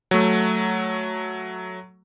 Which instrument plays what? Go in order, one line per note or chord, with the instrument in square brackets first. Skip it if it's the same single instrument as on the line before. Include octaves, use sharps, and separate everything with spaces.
[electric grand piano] F#3 A3